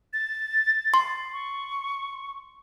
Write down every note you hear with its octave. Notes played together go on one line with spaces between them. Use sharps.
A6
C6
C#6